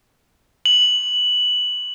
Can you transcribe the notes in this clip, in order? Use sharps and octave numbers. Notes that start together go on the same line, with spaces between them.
F#7